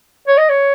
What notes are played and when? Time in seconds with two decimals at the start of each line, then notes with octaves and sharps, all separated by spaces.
0.27 C#5
0.38 D#5
0.49 C#5